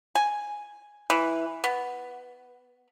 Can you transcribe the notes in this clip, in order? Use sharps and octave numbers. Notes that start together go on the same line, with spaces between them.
G#5
E3
B3